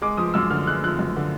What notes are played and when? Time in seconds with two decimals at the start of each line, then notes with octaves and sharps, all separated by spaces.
0.02 G#3 D6
0.17 F3 D#6
0.34 F#2 E6
0.50 D3 F6
0.67 G#3 F#6
0.84 F3 F#6
0.99 F#2
1.16 D3